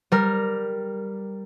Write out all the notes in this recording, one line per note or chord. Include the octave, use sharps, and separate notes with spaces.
G3 A#4